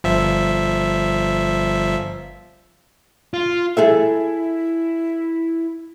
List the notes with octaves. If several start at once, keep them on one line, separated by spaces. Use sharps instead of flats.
G1 F3 E5
F4
E4 G#4 A4 E5